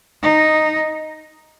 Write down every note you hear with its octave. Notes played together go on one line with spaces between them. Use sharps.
D#4